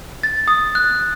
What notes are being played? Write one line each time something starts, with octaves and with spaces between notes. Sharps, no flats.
A6
D#6
F#6